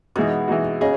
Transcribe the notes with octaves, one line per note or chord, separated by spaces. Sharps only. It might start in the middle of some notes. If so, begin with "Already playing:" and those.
B2 E3 G#3 D#4 F#4
E3 G#3 D#4 F#4
C#3 G#4 D#5